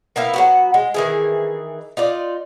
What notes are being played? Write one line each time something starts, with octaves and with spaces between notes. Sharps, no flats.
A#3 B3 E4 F5
F#3 B3 F#4
G#3
D#3 E3 G#4
D#4 F4 D5